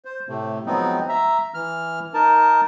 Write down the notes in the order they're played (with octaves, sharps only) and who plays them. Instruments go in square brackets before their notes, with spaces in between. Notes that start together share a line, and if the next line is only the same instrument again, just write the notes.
[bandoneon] C5
A2 C3 A3
F3 F#3 G#3 B3 C4 D#4
E5 A#5
E3 F6
D#4 A#4 A5